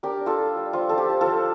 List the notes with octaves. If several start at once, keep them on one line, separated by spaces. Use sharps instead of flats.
D4 G4 A#4
D4
F4 A4
G3
G3
F3 F4
F3 A4
G4
F3
F4 A4
F3